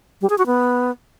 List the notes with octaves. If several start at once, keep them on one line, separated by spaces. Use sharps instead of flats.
G3
G#4
F#4
B3